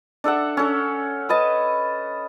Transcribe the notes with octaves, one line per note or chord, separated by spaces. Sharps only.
D4 A4 E5 F#5
C#4 A4
B4 D#5 A5